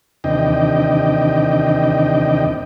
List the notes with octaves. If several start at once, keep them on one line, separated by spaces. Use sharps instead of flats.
D#2 C3 E3 D4 D#5 G5